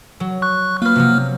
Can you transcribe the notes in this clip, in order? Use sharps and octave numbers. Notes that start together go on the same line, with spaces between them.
F#3
C#6 F#6
A#3 F4 B4 F6
C3 F3 F#3